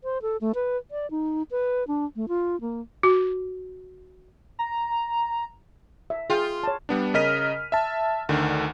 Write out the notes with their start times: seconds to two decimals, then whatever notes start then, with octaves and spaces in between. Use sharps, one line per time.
0.04 C5
0.22 A4
0.41 A3
0.55 B4
0.91 D5
1.11 D#4
1.51 B4
1.87 D4
2.16 A3
2.28 F4
2.61 A#3
3.03 F#4
4.59 A#5
6.10 E5
6.30 F4 G#4 G5
6.63 C#5 A5
6.89 G3 B3 D4
7.14 C#3 A#4 D#5 F6 B6 D#7
7.72 E5 A5
8.29 D2 D3 D#3